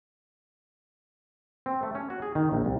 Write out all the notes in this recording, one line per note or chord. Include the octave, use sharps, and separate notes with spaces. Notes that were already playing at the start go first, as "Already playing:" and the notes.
C4
A3
C#4
F#4
G#4
D#3
A#1
C2